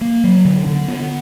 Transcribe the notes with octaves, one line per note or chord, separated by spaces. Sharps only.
A#3
F#3
D3
D3
B3